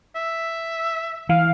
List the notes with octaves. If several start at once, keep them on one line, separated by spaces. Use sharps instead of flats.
E5
E3 F5